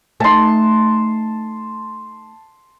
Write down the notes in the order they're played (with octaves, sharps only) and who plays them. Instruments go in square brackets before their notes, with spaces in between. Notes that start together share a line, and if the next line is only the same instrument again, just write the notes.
[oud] A3 D#4 [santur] A5 C6